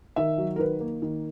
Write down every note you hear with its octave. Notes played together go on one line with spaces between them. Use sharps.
D#3 E5
F#3
A#4
D#3 B4
A#3
D#3